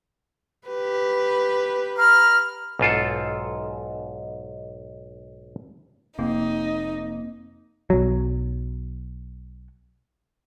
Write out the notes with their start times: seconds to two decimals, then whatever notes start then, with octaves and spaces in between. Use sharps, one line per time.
0.68 G4 B4
1.97 A#5 B5 F6
2.79 B1 G#2 F4 A4
6.19 F1 C3 A#3 C4 D#4
7.90 B1 F#3